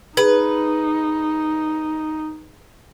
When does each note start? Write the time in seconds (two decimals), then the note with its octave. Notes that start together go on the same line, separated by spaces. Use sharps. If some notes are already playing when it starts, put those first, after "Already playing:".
0.17 D#4 G#4 B4